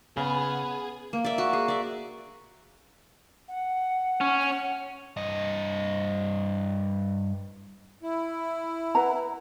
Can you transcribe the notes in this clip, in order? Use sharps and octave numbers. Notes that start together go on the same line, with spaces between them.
C#3 B3 G#4
A#3
D5 E5
F#4
G#4
D5 E5
F#5
C#4
F#5
G2 D#5
E4
B4 F#5 A#5